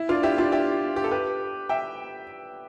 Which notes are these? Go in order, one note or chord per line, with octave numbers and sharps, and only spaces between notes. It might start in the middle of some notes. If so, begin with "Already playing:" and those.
Already playing: E4
D4 F4
E4 G4
D4 F4
E4 G4
G4
A4
G4 B4
E5 G5